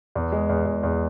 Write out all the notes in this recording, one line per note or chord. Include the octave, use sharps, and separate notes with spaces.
E2
G#3
E2
E2
E2